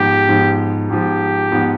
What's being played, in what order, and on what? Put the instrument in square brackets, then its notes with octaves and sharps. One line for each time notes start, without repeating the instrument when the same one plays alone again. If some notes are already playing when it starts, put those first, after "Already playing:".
Already playing: [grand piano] G#2 F3 B3 [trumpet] G4
[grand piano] G#2 F3 B3
[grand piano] G#2 F3 B3 [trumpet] G4
[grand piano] G#2 F3 B3